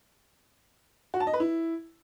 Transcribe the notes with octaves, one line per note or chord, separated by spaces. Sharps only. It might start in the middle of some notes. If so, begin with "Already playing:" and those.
F#4
A5
D#5
B4
E4